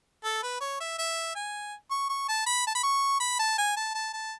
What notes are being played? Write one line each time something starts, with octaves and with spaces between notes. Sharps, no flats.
A4
B4
C#5
E5
E5
G#5
C#6
C#6
A5
B5
A5
B5
C#6
B5
A5
G#5
A5
A5
A5